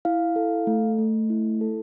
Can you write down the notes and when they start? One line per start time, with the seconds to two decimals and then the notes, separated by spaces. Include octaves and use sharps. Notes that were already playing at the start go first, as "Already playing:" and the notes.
0.05 E4 F5
0.36 A4
0.67 A3
0.99 A3
1.30 E4
1.61 A4